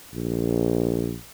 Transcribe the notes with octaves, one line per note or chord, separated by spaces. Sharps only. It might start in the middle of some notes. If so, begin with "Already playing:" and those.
A#1